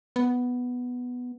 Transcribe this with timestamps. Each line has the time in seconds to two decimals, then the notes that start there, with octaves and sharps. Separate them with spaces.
0.16 B3